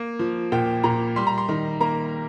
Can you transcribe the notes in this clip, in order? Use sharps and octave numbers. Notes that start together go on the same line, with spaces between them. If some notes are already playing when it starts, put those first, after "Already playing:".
Already playing: A#3
F3
A#2 G5
A#2 A#5
G3 C6
A#5
C6
D#3
A#3 A#5